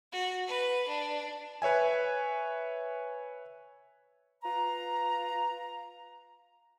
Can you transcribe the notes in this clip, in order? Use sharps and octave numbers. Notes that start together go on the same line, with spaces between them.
F#4
B4
D4
B4 C#5 E5 G#5
F4 B4 A#5